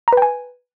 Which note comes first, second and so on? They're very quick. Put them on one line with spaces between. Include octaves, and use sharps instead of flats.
A#5 B4 G5 G#5